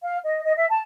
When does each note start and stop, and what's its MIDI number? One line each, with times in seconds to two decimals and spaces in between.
0.03 0.18 77
0.23 0.44 75
0.44 0.53 75
0.57 0.65 76
0.69 0.79 81